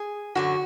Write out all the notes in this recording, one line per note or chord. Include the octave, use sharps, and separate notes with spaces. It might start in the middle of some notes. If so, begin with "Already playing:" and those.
Already playing: G#4
F#2 D3 F#3 F#4